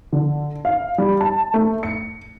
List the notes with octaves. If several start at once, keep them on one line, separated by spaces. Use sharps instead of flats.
D3
F5
G3
A5
A3
C#7